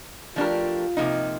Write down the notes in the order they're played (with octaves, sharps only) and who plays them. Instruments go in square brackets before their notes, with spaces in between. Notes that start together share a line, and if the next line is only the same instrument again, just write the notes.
[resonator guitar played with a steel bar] F3 A3 D4 G4 A#4 [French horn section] F4
[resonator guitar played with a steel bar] C3 F3 A#3 D#4